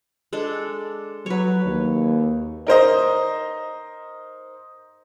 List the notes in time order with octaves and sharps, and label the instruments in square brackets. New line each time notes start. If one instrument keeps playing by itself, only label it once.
[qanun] G#3 D4 A4
[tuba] F#3 [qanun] B4 C#5
[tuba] D#2
[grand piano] D#4 A#4 C5 D#5